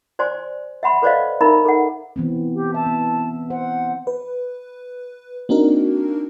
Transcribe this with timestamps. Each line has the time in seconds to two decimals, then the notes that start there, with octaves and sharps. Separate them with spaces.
0.19 C5 D5 G#5 C6
0.83 E5 F#5 B5 C6
1.02 A4 B4 C5 D5 D#5 F5
1.41 D#4 A#4 E5 A#5 B5
1.65 A4 F#5
2.16 E3 B3 C4
2.55 G4
2.74 E5 A5
2.87 B3
3.50 C5 F#5
4.07 B4
5.49 A#3 C4 D4 D#4 F#4 A#4